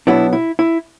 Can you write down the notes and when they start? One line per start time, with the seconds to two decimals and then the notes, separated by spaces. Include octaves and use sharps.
0.07 B2 F#3 B3 D4 E4
0.33 E4
0.59 E4